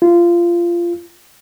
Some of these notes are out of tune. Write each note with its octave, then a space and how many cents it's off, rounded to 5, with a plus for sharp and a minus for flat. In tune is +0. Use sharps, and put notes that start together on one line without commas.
F4 -20